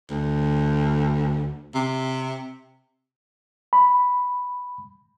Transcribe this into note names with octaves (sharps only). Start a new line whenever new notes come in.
D2
C3
B5